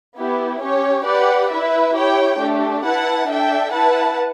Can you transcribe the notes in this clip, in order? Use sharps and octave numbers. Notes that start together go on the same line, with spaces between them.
B3 E4 G4
C#4 G4 C#5
G4 B4 D5 F#5
E4 B4 E5
E4 G4 C#5 G5
A3 D4 G4
E4 B4 F#5 A5
D4 A4 E5 G5
E4 B4 F#5 A5